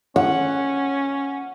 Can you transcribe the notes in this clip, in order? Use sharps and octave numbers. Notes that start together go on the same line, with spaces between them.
C#4 F#5